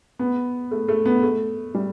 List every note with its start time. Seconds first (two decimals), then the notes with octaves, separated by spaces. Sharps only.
0.19 B3
0.71 A3
0.88 A3
1.05 B3
1.23 A3
1.75 G3